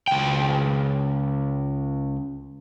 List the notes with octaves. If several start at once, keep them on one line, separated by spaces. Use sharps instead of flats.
C#2 G5